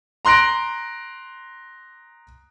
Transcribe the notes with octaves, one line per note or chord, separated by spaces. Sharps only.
A#5 C6 F#6 A#6 D7